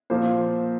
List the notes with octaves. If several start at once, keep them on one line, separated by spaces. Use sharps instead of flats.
A#2 F3 C5